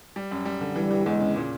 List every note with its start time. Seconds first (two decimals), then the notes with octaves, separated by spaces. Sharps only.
0.16 G3
0.31 F#2
0.45 G3
0.61 D3
0.76 E3 G3
0.91 E3
1.06 E2 G#3
1.20 C#3
1.36 A#2